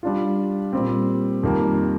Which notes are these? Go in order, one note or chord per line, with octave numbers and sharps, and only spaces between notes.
G3 D4 F4
A#2 G3 C4
F2 D#3 G3 A#3